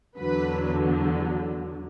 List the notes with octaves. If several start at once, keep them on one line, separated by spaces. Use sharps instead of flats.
E2 D3 F#3 B4